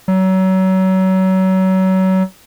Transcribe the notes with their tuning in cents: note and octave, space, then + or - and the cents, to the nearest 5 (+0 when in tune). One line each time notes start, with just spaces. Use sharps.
F#3 +30